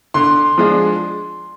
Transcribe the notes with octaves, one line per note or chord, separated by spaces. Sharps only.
D3 C6
F3 G#3 D4